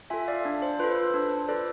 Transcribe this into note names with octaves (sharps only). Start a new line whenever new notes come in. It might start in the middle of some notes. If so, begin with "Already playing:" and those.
F4 A4 E5 G#5
D5 F5
D4
C5
F4 A4 B4
C5
B4
D4 C5
C5
F4 A4 B4 D5